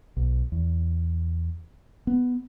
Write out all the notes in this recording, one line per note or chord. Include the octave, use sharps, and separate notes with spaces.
B1
E2
B3